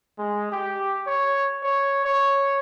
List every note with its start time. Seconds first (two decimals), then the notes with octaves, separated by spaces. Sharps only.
0.18 G#3
0.52 G4
1.07 C#5
1.63 C#5
2.05 C#5